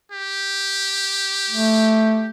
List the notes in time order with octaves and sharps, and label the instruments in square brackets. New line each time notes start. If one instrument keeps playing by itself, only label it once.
[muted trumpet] G4
[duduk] A3